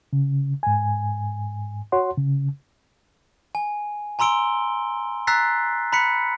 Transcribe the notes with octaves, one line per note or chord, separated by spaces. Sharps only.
C#3
G#2 G#5
F#4 C#5 F#5 C6
C#3
G#5
G#5 A#5 C6 E6 D7 G7
A#5 E6 F#6 A6 B6 C7
A#5 B5 F#6 B6 C#7